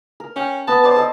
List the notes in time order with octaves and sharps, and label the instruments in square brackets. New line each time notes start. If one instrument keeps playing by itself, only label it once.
[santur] A#4
[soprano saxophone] C#4 [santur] G5
[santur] B3 A#5 [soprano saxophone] A5
[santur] C5 D5 D#5 [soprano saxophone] A5
[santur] A4 D#5